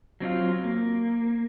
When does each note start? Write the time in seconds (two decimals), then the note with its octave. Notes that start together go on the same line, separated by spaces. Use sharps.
0.20 F#3 C4 D4 F4
0.64 A#3